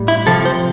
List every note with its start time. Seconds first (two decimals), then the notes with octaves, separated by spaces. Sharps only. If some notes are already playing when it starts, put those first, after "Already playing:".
Already playing: A2 G3
0.08 E4
0.27 C3 F3 A4
0.45 C5